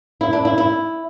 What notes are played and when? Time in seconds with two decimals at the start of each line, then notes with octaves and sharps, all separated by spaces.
0.21 E4
0.33 D4
0.45 E4
0.58 E4